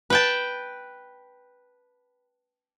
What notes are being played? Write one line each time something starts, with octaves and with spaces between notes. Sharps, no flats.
B4 G5 A5